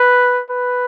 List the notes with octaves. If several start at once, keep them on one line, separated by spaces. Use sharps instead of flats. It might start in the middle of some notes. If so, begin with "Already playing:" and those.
Already playing: B4
B4